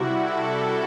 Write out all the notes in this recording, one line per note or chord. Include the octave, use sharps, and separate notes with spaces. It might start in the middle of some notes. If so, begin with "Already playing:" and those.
Already playing: C3 G3 E4 F#4
A4